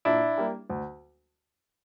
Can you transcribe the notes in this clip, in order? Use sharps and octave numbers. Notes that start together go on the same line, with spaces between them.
A#2 D4 E4
G3 A#3
D2